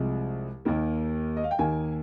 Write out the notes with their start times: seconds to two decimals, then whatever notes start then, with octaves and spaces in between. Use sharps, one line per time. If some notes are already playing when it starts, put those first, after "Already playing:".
Already playing: C2 C3 F3 G#3
0.65 D#2 D#3 A#3
1.37 D#5
1.44 F5
1.51 G5
1.59 D#2 D#3 A#3 G#5